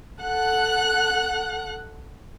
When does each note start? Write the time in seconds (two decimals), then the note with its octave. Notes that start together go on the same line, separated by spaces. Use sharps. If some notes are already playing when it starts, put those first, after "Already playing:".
0.20 A4 F#5 F#6